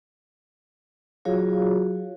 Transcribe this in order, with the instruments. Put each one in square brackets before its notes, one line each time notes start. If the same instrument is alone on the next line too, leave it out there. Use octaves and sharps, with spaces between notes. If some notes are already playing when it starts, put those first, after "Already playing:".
[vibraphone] F#3 F4 F#4 G#4 C#5 F5